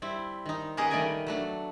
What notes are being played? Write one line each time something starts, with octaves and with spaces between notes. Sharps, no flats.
G3 C4 E4
D#3 D#4
A#3 B3 C#4 G4 G#4 D#5
D#3 G3 A3 D5 D#5 G#5
F#3 A3 D4